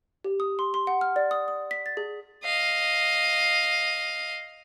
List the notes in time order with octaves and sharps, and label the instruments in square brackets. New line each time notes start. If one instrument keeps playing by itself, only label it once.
[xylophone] G4
D#6
C6
C6
F#5
F6
D5
D#6
D#6
B6
A6
G#4
[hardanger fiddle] D#5 F5